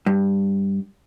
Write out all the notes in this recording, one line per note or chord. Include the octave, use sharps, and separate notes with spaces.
G2